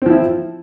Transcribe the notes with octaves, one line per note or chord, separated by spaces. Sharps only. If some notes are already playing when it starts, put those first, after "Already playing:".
F3 C4 E4